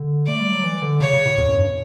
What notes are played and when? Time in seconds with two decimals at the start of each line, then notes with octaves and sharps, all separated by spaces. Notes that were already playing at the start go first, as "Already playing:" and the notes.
Already playing: D3
0.26 A3 D5
0.40 G3
0.52 F#3
0.63 E3
0.82 D3
1.00 C#3 C#5
1.13 C#3
1.26 A2
1.38 E2
1.48 F#2
1.57 G2